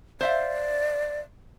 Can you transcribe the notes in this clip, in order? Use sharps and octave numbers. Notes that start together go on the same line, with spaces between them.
C5 D5 E5 F5